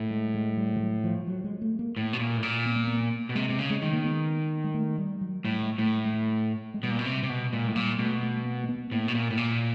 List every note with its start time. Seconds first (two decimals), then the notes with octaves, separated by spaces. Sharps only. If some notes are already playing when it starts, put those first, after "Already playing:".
Already playing: A2
0.11 G#3
0.34 G#3
0.57 G3
0.76 F3
0.80 F#3
1.04 F3
1.27 F#3
1.44 G#3
1.62 A3
1.79 A#3
1.97 A2
2.13 B2
2.19 A#2
2.37 A2
2.43 A#2
2.66 B3
2.76 A#3
2.87 B3
3.01 A#3
3.29 B2
3.35 C3 G#3
3.49 C3
3.59 C#3
3.70 G#3
3.82 D#3
3.93 A#3
4.04 B3
4.64 G#3
4.74 A3
4.98 G3
5.21 F#3
5.44 A2 G3
5.62 G#3
5.78 A2 A3
6.05 G#3
6.14 A3
6.74 G#3
6.83 B2 G3
6.91 A#2
6.99 B2
7.06 C3
7.23 C3
7.29 B2
7.53 A#2 G#3
7.68 A2 G#3
7.76 A#2 G3
7.99 B2 A3
8.23 A3
8.45 A#3
8.64 A#3
8.69 B3
8.92 A2 A#3
9.08 B2
9.15 A#2
9.30 A2
9.37 A#2